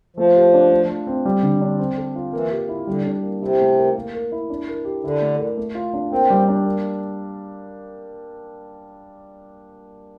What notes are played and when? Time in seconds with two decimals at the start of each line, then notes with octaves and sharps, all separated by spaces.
0.17 F3 A3
0.36 G4
0.54 D4
0.71 A3
0.89 F4
1.07 C4
1.25 G3
1.43 D3
1.61 D4
1.79 C4
1.97 A4
2.16 F4
2.33 E3 A#3
2.51 G4
2.69 E4
2.87 D3 G3
3.05 D4
3.23 A#3
3.41 C3 E4
3.60 A3
3.77 A#4
3.96 A#3
4.14 A#4
4.32 E4
4.50 D4
4.68 A#4
4.85 G4
5.04 D3 E4
5.21 A3
5.39 A#4
5.57 A3
5.75 F4
5.93 D4
6.11 A#3 C4
6.30 G3
6.48 D4
6.65 A#3